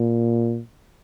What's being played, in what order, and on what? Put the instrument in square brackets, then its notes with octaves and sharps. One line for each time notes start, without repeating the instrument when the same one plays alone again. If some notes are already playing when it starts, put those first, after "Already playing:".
Already playing: [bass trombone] A#2